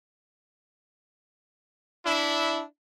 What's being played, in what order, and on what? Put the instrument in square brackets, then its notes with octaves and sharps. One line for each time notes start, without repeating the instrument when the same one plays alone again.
[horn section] D4 E4